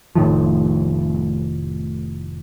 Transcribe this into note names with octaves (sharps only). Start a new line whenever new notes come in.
F1 A2 D#3 F3